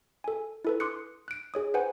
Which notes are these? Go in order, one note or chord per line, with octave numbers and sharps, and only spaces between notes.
A4 G#5
E4 A4 B4
C6 D6 D#6 F#6 C#7
F#6 D7
G#4 C#5 D#6
B4 C5 F#5 G#5